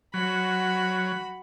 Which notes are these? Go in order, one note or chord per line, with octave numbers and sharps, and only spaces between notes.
F#3 F#4 B5